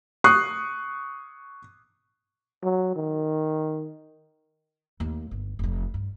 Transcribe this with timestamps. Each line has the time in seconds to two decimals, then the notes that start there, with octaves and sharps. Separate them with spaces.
0.24 C#6 D#6 F#6 C7
2.63 F#3
2.96 D#3
5.00 D#2 A3
5.31 G1
5.59 F1 F2
5.94 G2